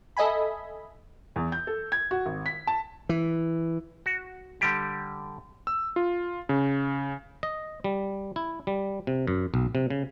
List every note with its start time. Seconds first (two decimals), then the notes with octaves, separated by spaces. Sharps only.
0.17 A4 D#5 E5 G#5 B5
1.36 E2
1.52 G6
1.67 A4
1.92 G#6
2.11 F#4
2.26 G#1
2.46 B6
2.67 A5
3.09 E3
4.06 F#4
4.61 D3 G3 G4
5.67 E6
5.96 F4
6.49 C#3
7.43 D#5
7.84 G3
8.36 E4
8.67 G3
9.07 C3
9.27 F#2
9.54 B1
9.75 C3
9.90 C#3